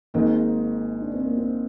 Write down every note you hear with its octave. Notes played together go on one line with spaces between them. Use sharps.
G#1 G#2 D#3 G#3 A#3 D#4
D4
C4
A#3
C4